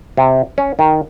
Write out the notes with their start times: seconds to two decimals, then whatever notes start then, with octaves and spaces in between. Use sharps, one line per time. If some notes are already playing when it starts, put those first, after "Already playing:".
0.17 C3
0.58 C#4
0.79 D#3